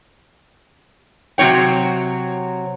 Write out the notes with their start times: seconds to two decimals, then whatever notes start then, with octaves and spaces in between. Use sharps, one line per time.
1.38 C3 F#3 C4 C#5 G5